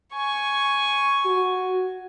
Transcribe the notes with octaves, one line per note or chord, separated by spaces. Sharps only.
G#5 C#6
F#4